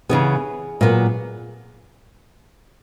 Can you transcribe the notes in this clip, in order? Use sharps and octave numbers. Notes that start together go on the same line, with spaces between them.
C#3 E3 B3 G#4
A#2 F#3 B3